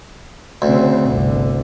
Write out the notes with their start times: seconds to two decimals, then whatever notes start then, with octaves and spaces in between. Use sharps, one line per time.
0.62 D2 C#3 C4
1.08 G1 C2 D3